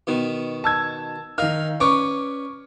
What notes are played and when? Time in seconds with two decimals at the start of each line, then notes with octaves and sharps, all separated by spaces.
0.07 B2 D#3 B3
0.64 A5 E6 G#6
1.38 D#3 D#4 A#4 F5 F6
1.80 C#4 B4 D5 C#6 D6